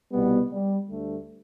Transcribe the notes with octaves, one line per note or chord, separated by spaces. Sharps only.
C2 B2 G3 B3
G3
D2 D3 G3 A3